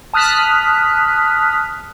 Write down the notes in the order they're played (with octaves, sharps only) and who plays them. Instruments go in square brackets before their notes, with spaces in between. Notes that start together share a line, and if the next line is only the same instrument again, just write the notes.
[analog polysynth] A5 D#6 F6 F#6 B6